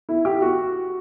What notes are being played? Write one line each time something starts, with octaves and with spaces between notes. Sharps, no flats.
E4
G4
F#4